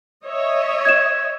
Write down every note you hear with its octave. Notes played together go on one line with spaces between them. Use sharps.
C#5 D#5 E5
G#6 E7